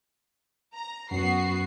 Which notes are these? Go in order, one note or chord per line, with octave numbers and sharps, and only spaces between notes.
A#5
F#2 B3 F#4 C7